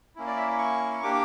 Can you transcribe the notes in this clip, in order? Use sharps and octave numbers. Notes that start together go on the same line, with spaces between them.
A#3 C#4 E4
D5
E5
C#6
A#3 D4 G4 D6